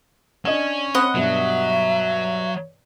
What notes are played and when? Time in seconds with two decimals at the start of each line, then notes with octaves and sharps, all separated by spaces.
0.45 C#4 D4 D#5 E7
0.95 C4 C5 D#5 F#5 B5
1.15 G2 B2 F#3 E5